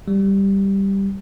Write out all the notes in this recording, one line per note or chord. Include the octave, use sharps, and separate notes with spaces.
G3